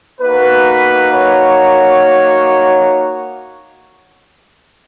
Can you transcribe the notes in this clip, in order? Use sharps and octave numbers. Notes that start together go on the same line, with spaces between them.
A#3 D#4 F#4 B4
C#5